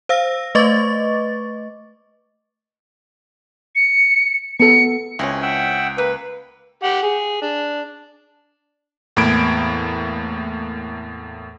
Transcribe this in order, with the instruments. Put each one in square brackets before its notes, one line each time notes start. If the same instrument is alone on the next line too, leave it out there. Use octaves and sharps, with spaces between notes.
[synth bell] C5 F5 E6 A#6
A3 B4 D#5 C#6 D6 A6
[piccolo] C#7
[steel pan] B3 A4 [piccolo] C#7
[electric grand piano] C#2 A#6 [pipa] E3 C4 C#4
[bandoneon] E5 F#5 G5
[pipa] A#3 [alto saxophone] B4
[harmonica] G4 F#5
G#4
D4
[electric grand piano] E2 A2 A#3 B5 G#6 D7